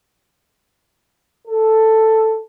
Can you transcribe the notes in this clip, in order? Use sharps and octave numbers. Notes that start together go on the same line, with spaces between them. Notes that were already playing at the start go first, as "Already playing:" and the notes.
A4